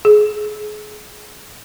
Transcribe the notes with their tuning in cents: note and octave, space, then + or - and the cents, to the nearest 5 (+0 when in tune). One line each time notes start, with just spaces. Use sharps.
G#4 +25